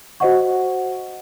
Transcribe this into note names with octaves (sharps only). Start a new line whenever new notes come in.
F#4 C5 D#5 F#5 C#6